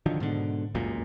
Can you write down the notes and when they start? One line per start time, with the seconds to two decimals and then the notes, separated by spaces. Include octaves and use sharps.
0.06 D3 D#3 F3 F#3
0.20 G#2 B2 D3
0.74 G1 C#2 F#2 A#2